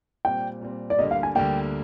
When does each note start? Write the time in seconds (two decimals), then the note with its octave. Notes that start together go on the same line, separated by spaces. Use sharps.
0.25 A#2 G3 C4 G5
0.61 A#2 G3 C4
0.90 D5
0.98 D2 D3 G3 A#3 D#5
1.11 F5
1.23 G#5
1.35 D2 D3 G3 A#3 G5